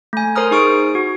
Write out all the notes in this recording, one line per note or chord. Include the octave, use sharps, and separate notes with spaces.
A3 G#5
A#4 C5 A#5 D#6 F6
D#4 G#4 C#6 D#6 D7
F#4